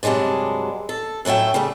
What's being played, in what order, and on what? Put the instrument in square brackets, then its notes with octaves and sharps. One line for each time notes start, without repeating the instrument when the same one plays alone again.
[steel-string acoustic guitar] G2 C3 F#3 G#3 D4
A4
F#2 A2 F#3 E5 G5
C#3 G3 A3